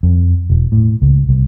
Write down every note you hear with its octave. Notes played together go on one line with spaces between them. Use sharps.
F2
E1
A2
C#2
C2